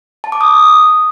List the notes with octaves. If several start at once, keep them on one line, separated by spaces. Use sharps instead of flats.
A5
D6
D#6